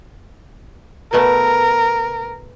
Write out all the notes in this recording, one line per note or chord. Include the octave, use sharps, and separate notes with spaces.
B2 A3 B3 A#4